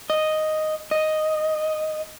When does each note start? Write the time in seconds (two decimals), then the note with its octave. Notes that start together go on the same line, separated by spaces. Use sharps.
0.10 D#5
0.91 D#5